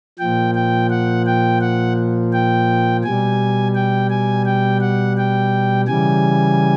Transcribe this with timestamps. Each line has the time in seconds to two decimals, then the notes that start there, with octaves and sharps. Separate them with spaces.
0.19 A#2 F3 G5
0.55 G5
0.91 F#5
1.26 G5
1.61 F#5
2.33 G5
3.04 B2 G3 G#5
3.75 G5
4.10 G#5
4.45 G5
4.81 F#5
5.17 G5
5.88 C#3 E3 G3 G#5